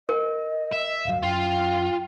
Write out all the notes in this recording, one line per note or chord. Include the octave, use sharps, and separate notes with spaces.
A#4 D#5
E5
D1 G2 F#3 F5
F#2 F4 G5